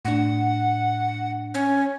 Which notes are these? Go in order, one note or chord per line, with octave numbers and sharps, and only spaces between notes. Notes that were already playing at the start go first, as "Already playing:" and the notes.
A2 D4 F#5
C#4